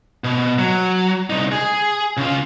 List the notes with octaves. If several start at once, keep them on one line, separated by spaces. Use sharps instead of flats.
B2
F#3
C2 D#4
G#4
C#3 F4